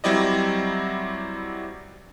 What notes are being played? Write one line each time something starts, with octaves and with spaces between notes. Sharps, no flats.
F#3 G3 C4 E4 D5 D#5